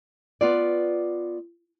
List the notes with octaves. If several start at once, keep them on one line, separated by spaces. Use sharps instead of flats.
B3 F4 D5